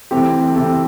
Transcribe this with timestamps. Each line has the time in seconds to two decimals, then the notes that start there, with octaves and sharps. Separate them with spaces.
0.11 C3 E3 A3 C4 G4
0.55 C3 E3 A3 C4 A4